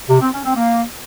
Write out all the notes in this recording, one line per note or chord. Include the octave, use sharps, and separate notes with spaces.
C3
C4
C#4
C4
A#3